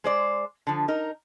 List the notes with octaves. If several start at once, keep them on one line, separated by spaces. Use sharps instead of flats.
G#3 C5 D5
D3 F3
D#4 A#4